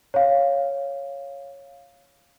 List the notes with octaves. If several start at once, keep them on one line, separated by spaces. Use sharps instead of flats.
C#5 F5